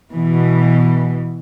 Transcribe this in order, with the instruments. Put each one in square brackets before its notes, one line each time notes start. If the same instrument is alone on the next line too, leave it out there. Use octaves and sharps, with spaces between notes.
[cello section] B2 E3